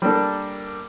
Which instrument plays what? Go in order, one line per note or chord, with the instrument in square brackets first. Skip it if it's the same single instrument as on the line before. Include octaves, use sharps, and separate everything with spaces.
[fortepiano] G3 A#3 D4 A4